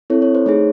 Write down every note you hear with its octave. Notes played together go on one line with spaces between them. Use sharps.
C4 E4 A4 C#5
C#5
C5
A3 D#4 G#4 C#5